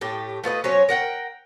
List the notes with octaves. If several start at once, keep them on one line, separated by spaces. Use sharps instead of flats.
A2 A3 G4
A3 F4 B4 D#5
F#3 C#4 C5 C#5
A#4 F#5 G5